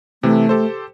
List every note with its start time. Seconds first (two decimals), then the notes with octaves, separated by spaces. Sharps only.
0.23 C3 E3 A3
0.49 G4 A4 C5